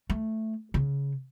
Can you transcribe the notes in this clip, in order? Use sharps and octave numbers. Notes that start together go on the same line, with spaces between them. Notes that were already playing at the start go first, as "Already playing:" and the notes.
A3
C#3